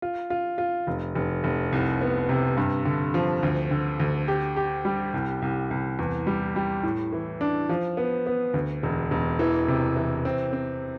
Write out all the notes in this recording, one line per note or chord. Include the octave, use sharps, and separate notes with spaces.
F4
F4
F4
F1
F1
F1
C2
B3
C3
G2
D3
F3
D2
D3
D2
G4
G4
G3
C2
C2
C2
E2
G3
G3
A2
E3
D4
F3
B3
B3
D2
E1
E1
E3
C3
E3
C4
C4